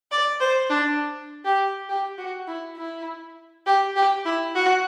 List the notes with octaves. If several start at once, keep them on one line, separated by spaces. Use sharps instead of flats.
D5
C5
D4
G4
G4
F#4
E4
E4
G4
G4
E4
F#4